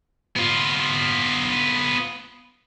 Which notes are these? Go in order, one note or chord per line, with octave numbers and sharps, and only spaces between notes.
B3 F4